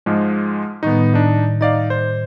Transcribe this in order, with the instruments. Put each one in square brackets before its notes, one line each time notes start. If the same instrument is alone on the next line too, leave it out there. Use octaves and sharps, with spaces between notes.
[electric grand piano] G#2 F3 G#3
[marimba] A2 D#3 G3 [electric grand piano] B3 D#4
[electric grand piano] D4 D#4
[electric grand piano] D#4 D5 F5 [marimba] D#5
[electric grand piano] C5